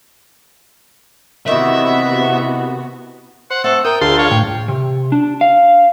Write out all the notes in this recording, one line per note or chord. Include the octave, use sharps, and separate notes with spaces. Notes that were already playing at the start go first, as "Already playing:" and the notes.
C3 D#3 E3 B3 E4 F#4 E5
C5 F#5
A3 C4 A4 F#5
A#4 G5 D#6
D2 F4 G#4 A5 C6
C#5 F5
A2 G5
C3
D4
F5